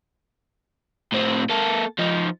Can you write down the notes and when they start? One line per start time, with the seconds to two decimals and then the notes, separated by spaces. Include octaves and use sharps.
1.12 A2 C4
1.49 A#3 A4
1.99 F3 D#4